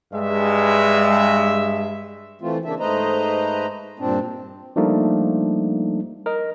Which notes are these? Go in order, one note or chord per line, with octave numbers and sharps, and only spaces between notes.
G2 G#3 E5
E3 A3 C4 F4
C#3 A#3 D4 E5
G#2 A3 B4 C5 D#5 A#5
G2 A#2 C4 D4
F3 G3 A3 A#3 D4 D#4
A#4 D#5